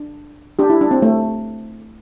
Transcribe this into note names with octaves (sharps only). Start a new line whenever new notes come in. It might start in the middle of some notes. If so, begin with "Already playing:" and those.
Already playing: D4
D4 G4
E4
D4
C4
A3